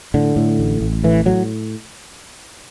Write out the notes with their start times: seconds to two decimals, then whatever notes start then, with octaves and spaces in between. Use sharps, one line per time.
0.14 A2 D3
0.36 A2
0.59 A1
0.81 A1
1.04 A2 E3
1.25 A2 F#3